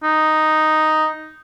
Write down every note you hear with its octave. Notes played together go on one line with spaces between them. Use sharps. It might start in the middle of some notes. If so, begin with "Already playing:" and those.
D#4